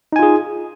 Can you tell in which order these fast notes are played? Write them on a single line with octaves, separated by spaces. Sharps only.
D#4 G#5 F4 G#4